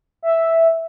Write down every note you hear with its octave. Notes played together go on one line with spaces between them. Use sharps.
E5